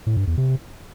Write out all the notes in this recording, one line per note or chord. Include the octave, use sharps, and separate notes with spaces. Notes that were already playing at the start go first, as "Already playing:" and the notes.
A2
G2
E2
C3